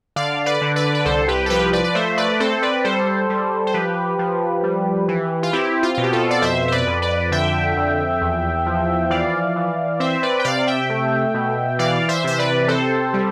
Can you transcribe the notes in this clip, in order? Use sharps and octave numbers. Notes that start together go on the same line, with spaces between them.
D3 D5 F5
B4 D5
D3
B4 D5
B4
C2 A4 C5
G4 B4
A4
F3 G4 B4
B4 D5
D5
A3 C5 E5
B4 D5
C4 A4 C5
B4 D5
G3 A4 C5
G3
C5
F3 G4 B4
F3
G3
E3
F4
C4 E4 G4
F4
B2 F4
G4
F4 A4
D5
F2 C5 E5
C5
B4 D5
F2
B4 D5
D3 E5 G5
F2
E2
F3
E3 D5 F5
E3
C4 C5 E5
B4 D5
G5
C3 D5 F5
E5 G5
A3
B2
E3 D5 F5
C5 E5
C3 C5
B4 D5
C4 A4 C5
G3